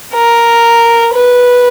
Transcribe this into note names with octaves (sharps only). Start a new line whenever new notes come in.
A#4
B4